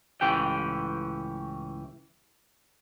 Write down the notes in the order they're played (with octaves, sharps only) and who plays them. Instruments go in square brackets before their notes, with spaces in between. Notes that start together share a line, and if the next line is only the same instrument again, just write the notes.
[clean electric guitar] C#2 A2 E3 C#4 G4 G5